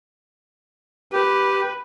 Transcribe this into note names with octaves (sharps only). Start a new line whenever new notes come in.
G4 B4